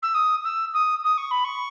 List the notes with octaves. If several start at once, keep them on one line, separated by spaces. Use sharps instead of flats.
E6
D#6
E6
D#6
D#6
C#6
B5
C#6